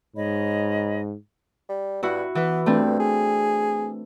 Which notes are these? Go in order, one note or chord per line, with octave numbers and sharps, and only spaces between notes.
G#2 C#5 D#5 B5
G3
G2 E4 F#4
E3 B3 B4
G2 A3 C4 D4
G#4